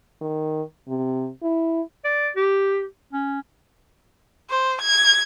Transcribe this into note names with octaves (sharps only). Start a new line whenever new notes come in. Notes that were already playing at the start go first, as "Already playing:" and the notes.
D#3
C3
E4
D5
G4
C#4
C5
G#6